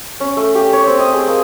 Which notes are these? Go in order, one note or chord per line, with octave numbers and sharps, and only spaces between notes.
C#4
A3
G4
C#5
C4
D#5
G#4
A#3